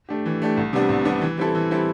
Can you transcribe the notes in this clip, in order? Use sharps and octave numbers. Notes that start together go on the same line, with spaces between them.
A3 D4 G4
E3
A3 D4 G4
C2
C3 G3 B3 D4
C2
C3 G3 B3 D4
E3
G3 C4 E4 A4
E3
G3 C4 E4 A4